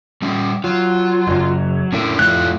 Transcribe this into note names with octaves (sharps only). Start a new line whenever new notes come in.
G3 C#4
F#3 F4
F#1 F#2
A2 C#4 D4 A#4
F2 A3 F4 F#6